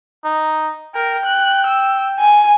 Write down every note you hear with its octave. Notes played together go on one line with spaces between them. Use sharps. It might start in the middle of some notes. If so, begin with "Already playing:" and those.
D#4
A#4 G5
F#6
E6
G#5